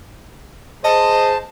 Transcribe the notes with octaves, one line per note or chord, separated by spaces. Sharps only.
G#4 C5 D#5 A5